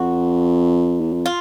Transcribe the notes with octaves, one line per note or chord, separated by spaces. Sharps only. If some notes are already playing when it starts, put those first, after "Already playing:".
Already playing: F2 F#4
E2
F2
F4